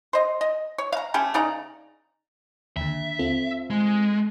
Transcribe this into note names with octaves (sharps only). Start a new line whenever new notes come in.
C5 D#5
D#5
C#5
F5 A#5
A3 C#4 G4 A4
C#3 D#4 D5 A#5
D#2 D3 E5
C4 F4 A4
G#3